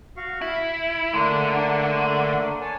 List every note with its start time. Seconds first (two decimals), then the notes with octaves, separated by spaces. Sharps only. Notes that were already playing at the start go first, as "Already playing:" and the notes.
0.17 F#4 F5 C#6
0.41 E4 B5
1.14 D3 A3 A#3 D4
2.61 C#5 G#5 A5